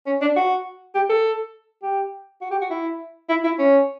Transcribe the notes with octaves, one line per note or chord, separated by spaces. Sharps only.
C#4
D4
F#4
G4
A4
G4
F#4
G4
F#4
E4
E4
E4
C#4